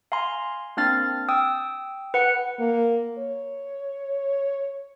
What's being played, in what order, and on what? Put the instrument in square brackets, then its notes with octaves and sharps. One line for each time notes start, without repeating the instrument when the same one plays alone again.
[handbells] F5 G#5 A#5 C6
A#3 C4 D4 F5 F6 A6
G5 D#6 E6
B4 F#5 C#7
[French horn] A#3
C#5